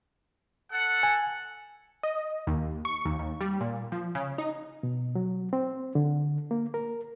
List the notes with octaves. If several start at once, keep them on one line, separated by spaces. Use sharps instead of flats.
A4 F#5
G#5
D#5
D#2
C#6
D#2
D#2
G3
A#2
F3
C#3
D#4
B2
F#3
C4
D3
A#3
A#4